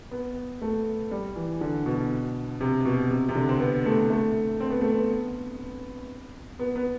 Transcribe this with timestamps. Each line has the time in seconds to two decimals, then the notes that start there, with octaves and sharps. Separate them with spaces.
0.11 B3
0.62 A3
1.11 G3
1.36 E3
1.61 D3
1.86 B2
2.61 C3
2.85 B2
3.11 C3
3.29 C3
3.35 D3
3.49 C4
3.60 B3
3.86 A3
4.10 A3
4.60 C4
4.71 B3
4.81 A3
4.92 B3
6.59 B3
6.76 B3